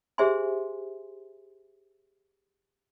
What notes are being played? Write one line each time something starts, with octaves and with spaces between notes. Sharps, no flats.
G4 G#4 C5 E5 G#5 C6